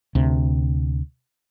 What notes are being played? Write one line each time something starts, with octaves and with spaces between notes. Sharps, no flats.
D2 C3